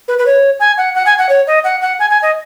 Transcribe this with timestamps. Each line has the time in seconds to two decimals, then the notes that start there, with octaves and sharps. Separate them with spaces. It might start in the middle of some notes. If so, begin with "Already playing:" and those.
0.08 B4
0.19 B4
0.26 C#5
0.60 G#5
0.78 F#5
0.95 F#5
1.06 G#5
1.18 F#5
1.29 C#5
1.47 D#5
1.64 F#5
1.81 F#5
2.00 G#5
2.10 G#5
2.22 D#5